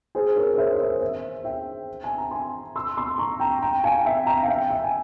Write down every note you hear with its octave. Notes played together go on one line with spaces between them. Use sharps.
G#4 C5
A#4 C#5
C#5
C5 E5
C#5
C5 E5
C5 E5
E5 G5
G#5
A#5
G#5 C6
C6 E6
C6 E6
A#5 C#6
G5 A#5
G5 A#5
F5 G#5
E5 G5
G5 A#5
F5
E5 G5
E5 G5
G#5